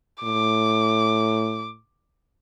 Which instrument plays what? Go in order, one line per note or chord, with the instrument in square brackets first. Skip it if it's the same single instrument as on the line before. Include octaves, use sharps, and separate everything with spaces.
[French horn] A2 [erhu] D6